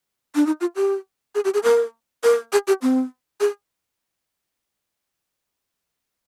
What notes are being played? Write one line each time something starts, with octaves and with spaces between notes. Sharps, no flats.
D4
D#4
F4
G4
G#4
G4
G#4
A#4
A#4
G#4
G4
C4
G#4